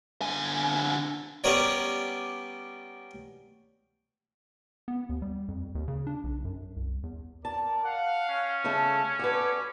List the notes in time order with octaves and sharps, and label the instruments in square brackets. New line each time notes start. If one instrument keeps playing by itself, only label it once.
[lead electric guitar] D3 G#5
[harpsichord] G3 B3 C#4 A#4 C#5 D5
[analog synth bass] B3
D#2
G3
F2
D#2
C#3
D4
B1
F#2
C2
E2
[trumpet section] A#4 D5 [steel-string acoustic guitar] A5
[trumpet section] F5 [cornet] F#5
[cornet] C#4
[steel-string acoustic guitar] C#3 A3 A4 [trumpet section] G3 F5 A5
[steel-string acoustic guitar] F#4 A4 B4 [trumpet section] D5 D6